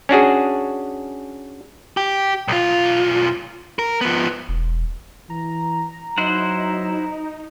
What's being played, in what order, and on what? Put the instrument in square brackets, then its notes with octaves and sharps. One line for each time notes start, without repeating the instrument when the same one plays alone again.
[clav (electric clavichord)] C#4 D4 F#4 G#4
[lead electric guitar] G4
B1 F4
A#4
F3 B3
[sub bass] E1
[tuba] E3 [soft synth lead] A#5
[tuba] F#3 [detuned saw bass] D#4 [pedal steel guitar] E4 C5 F#5